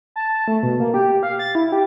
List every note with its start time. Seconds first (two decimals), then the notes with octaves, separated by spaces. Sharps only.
0.16 A5
0.48 A3
0.63 B2
0.80 A#3
0.94 G4
1.23 F5
1.39 A6
1.55 E4
1.72 G4